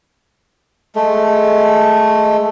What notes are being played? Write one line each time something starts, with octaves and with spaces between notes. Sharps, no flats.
G#3 A3